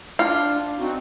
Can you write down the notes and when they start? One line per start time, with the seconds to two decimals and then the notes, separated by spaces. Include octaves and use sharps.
0.19 D4 F4
0.79 C4 D#4 F#4